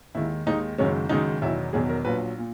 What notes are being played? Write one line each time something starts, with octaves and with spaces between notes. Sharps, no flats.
D#2 D#3 G#3 E4
D#2 D#3 G#3 D#4
F#1 F#2 D#3 G#3 C#4
F#1 F#2 D#3 G#3 D#4
E1 E2 D#3 F#3 E4
E1 E2 D#3 F#3 G#4
A#4
A#1 A#2 F#3 B4
A#2